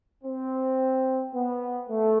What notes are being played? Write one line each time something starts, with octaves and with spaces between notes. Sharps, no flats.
C4
B3
A3